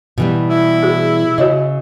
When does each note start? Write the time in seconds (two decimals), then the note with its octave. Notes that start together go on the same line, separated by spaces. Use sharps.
0.18 B2 E3 G3
0.50 E4
0.83 F#4 G#4
1.38 C#3 F#4 C#5 D#5